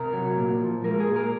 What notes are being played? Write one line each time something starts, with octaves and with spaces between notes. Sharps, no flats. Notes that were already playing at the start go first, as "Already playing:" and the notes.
Already playing: C3 A#4
F#3
A#2
F3
G#3 A#4
G#4
A#2
A#4